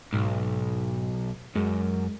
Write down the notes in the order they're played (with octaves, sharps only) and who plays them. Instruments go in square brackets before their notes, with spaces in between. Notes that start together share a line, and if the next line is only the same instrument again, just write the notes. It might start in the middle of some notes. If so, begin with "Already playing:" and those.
[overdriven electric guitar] B1 [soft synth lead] G#2
[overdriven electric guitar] F#2 [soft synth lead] G#3